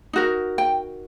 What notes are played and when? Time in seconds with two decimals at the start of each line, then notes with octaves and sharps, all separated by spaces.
0.13 D#4 F#4 A#4
0.58 G5